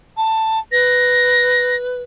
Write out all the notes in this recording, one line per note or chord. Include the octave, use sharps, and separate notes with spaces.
A5
B4 A#6